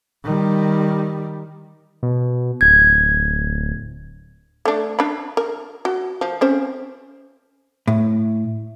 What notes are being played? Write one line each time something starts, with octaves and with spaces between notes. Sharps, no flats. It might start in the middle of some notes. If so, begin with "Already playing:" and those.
D#3 G3
B2
D1 G#6
A3 D4
D4 B5
A#4
F#4
F3
C4 C#4 C5
A2